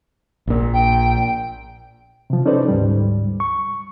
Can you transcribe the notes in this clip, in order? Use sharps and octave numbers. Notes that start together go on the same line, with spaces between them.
A#1 A#2
G5
C3 F3
C#4 D#4 A4 B4 C5 D5
D2 G#2 G3
C#6